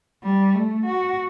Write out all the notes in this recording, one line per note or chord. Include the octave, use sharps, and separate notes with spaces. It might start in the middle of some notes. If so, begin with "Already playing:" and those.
G3
A3
F#4